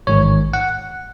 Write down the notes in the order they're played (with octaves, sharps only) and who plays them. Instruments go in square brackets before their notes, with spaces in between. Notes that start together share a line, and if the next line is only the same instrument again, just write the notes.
[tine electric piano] A1 G#2 D#3 C#5
F#5